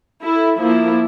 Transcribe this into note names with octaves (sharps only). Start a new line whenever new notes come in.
E4 A4
F3 A#3 E4